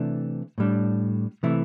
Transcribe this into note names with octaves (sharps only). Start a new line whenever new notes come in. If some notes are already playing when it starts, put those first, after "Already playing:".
Already playing: C3 E3 A3 D4
A2 G3 D4
C3 E3 A3 E4